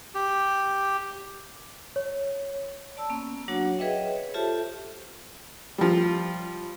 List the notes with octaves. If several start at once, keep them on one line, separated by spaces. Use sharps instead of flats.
G4
C#5
D5 A5 E6
A#3 B3 C#4
F#3 D4 F#4 C#5 F#5
G#4 B4 C#5 D#5 E5 G5
C#5
F4 G4 A4 C5 E5 A5
F3 G3